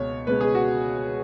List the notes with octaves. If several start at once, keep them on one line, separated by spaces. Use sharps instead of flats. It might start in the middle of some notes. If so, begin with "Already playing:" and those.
Already playing: C#2 B2 G#3 C#5
C#2 B2 G#3 B4
G#4
F#4